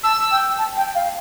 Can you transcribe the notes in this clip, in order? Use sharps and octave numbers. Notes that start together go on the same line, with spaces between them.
A5 E6
G5
A5
G5
F5